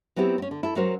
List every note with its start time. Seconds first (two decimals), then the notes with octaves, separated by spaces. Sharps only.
0.16 F#3 B3 C4 E4 G4
0.38 C4 C#4
0.51 D3
0.63 E4 A4
0.76 F#3 C#4 F#4 A#4 C5